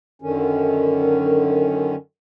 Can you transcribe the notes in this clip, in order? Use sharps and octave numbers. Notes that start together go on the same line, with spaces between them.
F#2 D3 D#3 C#4